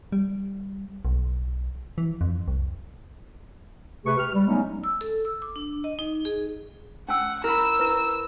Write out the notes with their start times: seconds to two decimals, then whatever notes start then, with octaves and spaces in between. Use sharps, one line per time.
0.12 G3
1.05 B1
1.98 E3
2.21 F2
2.48 C2
4.05 C3 A3 G4 G#4 B4 C#6
4.18 G4 F6
4.33 G3
4.47 F#3 G#3 A3 B3 C#4 D#4
4.84 E6
5.01 A4
5.25 E6
5.42 D6
5.56 D4
5.84 D#5
5.99 D#4
6.25 G#4
7.09 C#4 F#5 G#5 E6
7.44 E4 A#4 B5 E6
7.79 E4 B4